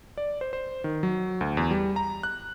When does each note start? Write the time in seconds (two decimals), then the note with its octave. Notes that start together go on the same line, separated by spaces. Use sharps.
0.17 D5
0.41 C5
0.53 C5
0.84 D#3
1.03 F#3
1.41 D2
1.57 E2
1.71 G3
1.96 A#5
2.23 F#6